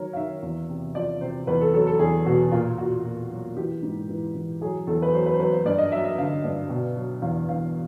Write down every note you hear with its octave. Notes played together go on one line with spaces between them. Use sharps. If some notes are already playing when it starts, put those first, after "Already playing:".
Already playing: D#3 F#3 A#4 C#5
F5
D#3 E5
E2
C3
F3 D5
C3 C5
E2 B4
A4
F#3 A4
A4
E2 G#4
B2 F#4
A#2 F4
A#2 F#4
A#2
F#3
E3 G4
G#2
E3
E3
F#3 G#4
E2 A4
B4
F#3 C5
B4
C5
F#3 B4
C5
G2 D5
D#5
F#3 E5
E5
D3 F5
G2
B2
F#3
E2 F5
E2 F5